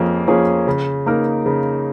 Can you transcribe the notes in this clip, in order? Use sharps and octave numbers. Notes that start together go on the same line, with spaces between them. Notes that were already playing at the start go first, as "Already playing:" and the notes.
Already playing: F2 F3 A#3 C#4 G#4
F3 A#3 C#4 G#4
C#3
A#3 D#4 A#4
C#3